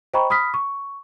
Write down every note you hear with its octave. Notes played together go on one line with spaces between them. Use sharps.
C5 D#5 G5 A#5 B5 C#6
B5 D#6 F6 B6
C#6